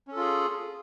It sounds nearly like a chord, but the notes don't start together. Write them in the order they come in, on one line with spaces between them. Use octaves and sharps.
C#4 A4 F4 G#4